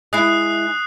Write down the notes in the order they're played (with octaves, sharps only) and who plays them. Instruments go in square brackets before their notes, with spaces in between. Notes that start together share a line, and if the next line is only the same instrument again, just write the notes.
[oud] G#3 E4 [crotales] D#6 F#6 C7